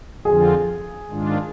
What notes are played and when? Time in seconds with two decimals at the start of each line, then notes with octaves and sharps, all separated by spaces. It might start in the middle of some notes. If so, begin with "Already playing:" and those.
0.25 F2 D3 F3 C4 F4 G#4
1.08 G#2 D#3 G#3 D4 F4